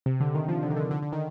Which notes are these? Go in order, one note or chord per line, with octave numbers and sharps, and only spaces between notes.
C3
D3
D#3
F3
D3
D#3
D3
D3
D3
D#3